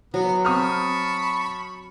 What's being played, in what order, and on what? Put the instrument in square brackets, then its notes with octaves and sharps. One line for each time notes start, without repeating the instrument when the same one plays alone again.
[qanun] F#3 [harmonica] B3
[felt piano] C4 D#6 F6 [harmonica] A5 B5 C#6